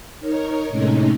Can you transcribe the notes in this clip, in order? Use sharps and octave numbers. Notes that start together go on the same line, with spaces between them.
D#4 A#4 C#5
A2 C3 G#3 A3 C#4 D#4